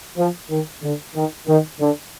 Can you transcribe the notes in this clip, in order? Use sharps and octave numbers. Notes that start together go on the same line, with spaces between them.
F3
D#3
D3
D#3
D#3
D3